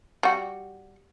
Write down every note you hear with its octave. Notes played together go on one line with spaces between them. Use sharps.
G3 F#4